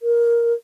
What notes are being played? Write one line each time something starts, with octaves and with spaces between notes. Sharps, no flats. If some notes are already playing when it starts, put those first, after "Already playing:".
A#4